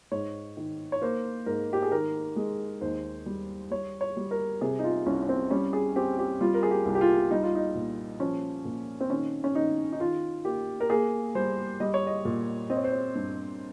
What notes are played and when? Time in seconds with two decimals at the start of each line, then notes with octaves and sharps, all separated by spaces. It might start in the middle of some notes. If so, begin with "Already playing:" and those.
0.11 G#2 C#5
0.57 D#3
0.92 C#5
1.02 A#3 C5
1.46 G#2 A#4
1.73 G4
1.83 G#4
1.92 D#3 A#4
2.36 G#3
2.81 D#2 C5
3.26 G3
3.71 G3 C#5
4.01 C#5
4.17 G3
4.31 A#4
4.61 C3 G#4
4.79 D#4
4.84 F4
5.06 C2 C#4
5.23 C#4
5.29 C4
5.51 G3 C#4
5.73 G#4
5.96 C4 G4
6.19 G4
6.41 G3 F4
6.54 A#4
6.63 G#4
6.71 G4
6.86 C2
6.95 G4
7.01 F4
7.31 G3 D#4
7.43 F4
7.55 D#4
7.75 A#2
8.20 F3 C#4
8.65 A#2
9.00 C4
9.10 D#3 C#4
9.44 C#4
9.55 D#3 D#4
9.92 D#4
10.00 D#3 F4
10.45 A#3 G4
10.80 A#4
10.90 A#3 G#4
11.35 G3 C5
11.80 G3 D#5
11.94 C#5
12.07 D#5
12.25 A#2
12.70 C4 D#5
12.77 C#5
12.84 C5
12.92 C#5
13.15 G2